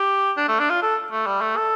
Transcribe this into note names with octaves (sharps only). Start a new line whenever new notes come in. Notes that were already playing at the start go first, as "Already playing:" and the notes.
Already playing: G4
D4
A3
D4
F4
A4
A3
G3
A3
A4